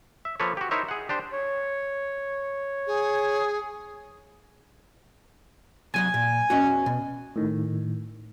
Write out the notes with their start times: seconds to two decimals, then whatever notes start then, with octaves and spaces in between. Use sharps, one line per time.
0.25 E5
0.40 F3 A#3 A4 B4 C#5
0.57 F#4 G4
0.71 D#4 E4 A#4 C5 C#5 E5
0.89 G#4 F#5
1.09 D4 G4 C5
1.32 C#5
2.87 G#4
5.94 C2 F#3 D#5 G#5
6.14 A#2
6.50 E2 C#4 F#4 D#5
6.86 B2
7.36 A2 D#3